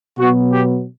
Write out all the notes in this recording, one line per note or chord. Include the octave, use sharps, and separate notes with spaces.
B2 F#3 B3 F#4
G4